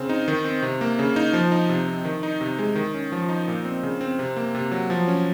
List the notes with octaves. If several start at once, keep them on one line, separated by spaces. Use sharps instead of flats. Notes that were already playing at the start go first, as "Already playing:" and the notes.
Already playing: C#3 C4
D#4
D#3
C4
C3
A#3
C#3
D#4
F3
D#4
C3
C4
D#3
D#4
C3
G#3
D#3
C#4
F3
D#4
A#2
C4
C#3
C4
C3
A#3
C3
F#3
F3
C#4